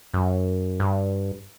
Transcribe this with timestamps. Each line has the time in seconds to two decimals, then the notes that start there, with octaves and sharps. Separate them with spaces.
0.14 F#2
0.80 G2